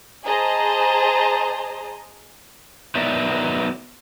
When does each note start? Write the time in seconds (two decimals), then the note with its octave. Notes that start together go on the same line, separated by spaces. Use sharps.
0.25 G#4 C5 D#5 A5 A#5
2.95 F#3 B3 D#4 A#4 D5 E5